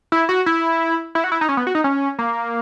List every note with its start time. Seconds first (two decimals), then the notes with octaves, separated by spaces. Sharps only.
0.12 E4
0.29 F#4
0.46 E4
1.15 E4
1.24 F#4
1.32 E4
1.41 D#4
1.49 C#4
1.57 B3
1.67 F#4
1.75 D#4
1.84 C#4
2.19 A#3